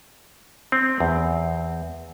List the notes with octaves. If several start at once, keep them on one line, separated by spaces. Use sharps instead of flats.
C4
E2